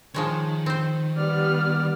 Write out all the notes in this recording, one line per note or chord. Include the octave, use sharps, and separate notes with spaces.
D#3 F3 G#3 C#5
C4 C5
G3 B3 D5 F6